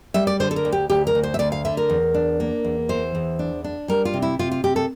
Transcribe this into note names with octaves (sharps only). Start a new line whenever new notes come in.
G3 E5
D5
D3 C5
A4
A#4
D2
G4
D2 G4
A#4
D2
C5
E5
D2 D5
F5
D3 E5
A#4
E2
D4
A#3
E2
E3 C5
E2
D4
D4
G3 A#4
F4
C3
E4
C3 F4
F4
C3 G4
A4